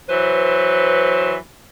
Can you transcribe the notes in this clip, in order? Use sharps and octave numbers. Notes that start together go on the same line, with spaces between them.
E3 F#3 B4 C5